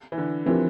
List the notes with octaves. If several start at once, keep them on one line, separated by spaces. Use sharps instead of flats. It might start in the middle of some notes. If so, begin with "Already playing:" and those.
E3
D3
E3 F3 C4 E4 G4 A#4